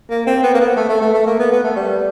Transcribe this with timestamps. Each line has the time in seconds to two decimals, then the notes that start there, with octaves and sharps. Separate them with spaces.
0.10 A#3
0.27 C4
0.43 B3
0.54 A#3
0.60 B3
0.76 A3
0.89 A3
1.02 A3
1.14 A3
1.26 A#3
1.39 B3
1.51 B3
1.64 A3
1.76 G3